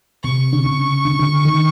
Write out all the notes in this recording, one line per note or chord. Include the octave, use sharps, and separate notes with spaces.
C3 C#6
D3
C#3
D3
C#3
D3
D#3